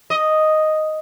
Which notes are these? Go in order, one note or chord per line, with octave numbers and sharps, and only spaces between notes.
D#5